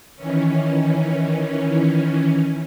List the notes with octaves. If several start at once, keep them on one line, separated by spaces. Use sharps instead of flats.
D#3 E3 C#4